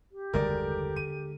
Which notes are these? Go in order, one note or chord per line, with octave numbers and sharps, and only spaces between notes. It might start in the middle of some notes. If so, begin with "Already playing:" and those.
G4
F#1 D#2 D3 G3 G#3 A#4 D5
D#7